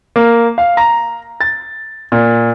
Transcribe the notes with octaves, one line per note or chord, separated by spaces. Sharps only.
A#3
F5
A#5
A6
A#2